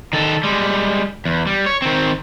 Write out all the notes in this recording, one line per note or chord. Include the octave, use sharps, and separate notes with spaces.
D#3 A4
G3 G#3
E2
G3
C#5
D#3 C4